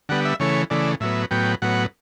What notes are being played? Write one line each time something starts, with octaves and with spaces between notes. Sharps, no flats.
D3 G3 B3 F#5
E5
C#3 E3 A3 C#5
C#3 E3 A3 D5
A2 F#3 B3 E5
A2 F#3 B3 G5
A2 F#3 B3 F#5